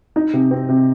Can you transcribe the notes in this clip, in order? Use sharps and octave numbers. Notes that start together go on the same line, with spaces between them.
D#4
C3
C4
C3